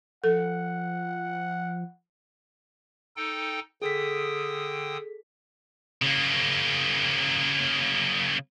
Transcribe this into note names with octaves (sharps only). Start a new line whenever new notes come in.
F3 A4 F#5
D#4 A4 G5
D3 G#4 A4 G5 D#6 B6
C#3 A#3